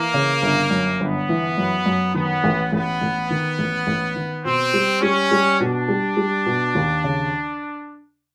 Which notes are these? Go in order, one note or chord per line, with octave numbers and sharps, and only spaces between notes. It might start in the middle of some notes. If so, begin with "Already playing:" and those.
Already playing: E3 A#3
C#3
G1
F#2
G1 B3
E3
F#2
F#2
D#3 B3
A1
A1 B3
A1
D#3
A1
A1
D#3
B2 C4
G3
G3 C#4
G3
B2 D4
G3
G3
B2
D#2
C#3